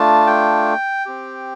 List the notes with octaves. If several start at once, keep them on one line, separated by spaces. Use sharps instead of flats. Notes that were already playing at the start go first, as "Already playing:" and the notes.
Already playing: A3 D4 F4 A5
G5
C4 G4